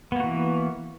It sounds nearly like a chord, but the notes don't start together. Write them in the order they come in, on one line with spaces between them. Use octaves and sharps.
B3 A#3 F#4 E3